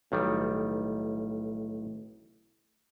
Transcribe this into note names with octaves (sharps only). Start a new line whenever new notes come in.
B1 A2 D#3 G3